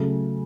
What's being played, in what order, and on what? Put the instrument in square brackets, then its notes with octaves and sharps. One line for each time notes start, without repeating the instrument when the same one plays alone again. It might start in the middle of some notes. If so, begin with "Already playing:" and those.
Already playing: [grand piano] C#3 F#3 A3